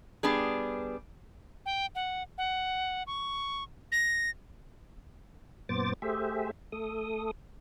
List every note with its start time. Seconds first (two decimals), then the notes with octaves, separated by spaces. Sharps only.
0.23 G3 B3 D4 G#4
1.66 G5
1.95 F#5
2.38 F#5
3.07 C#6
3.92 A#6
5.69 F#2 A#2 B3 C5 D6 A6
6.02 A3 G4 G#4 C5 E5
6.72 A3 A4 D#6